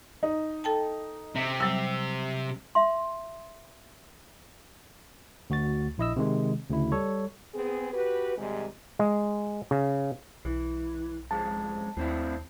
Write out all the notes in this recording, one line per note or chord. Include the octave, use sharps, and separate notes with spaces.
D#4
A4 G5 A5
C3
F#3 G3 E6
E5 C6
D2 F#4 A6
A#1 E4 D#5 E6
C3 D#3 G#3
D2 C#3 E4
G3 A4 C#5
B3 C4 G#4
F#4 G4 B4
G#2 C3 D#3 G3 G#3
G#3
C#3
B1 E3
F2 G#2 G#3 A5
D#2 A2 C4 E4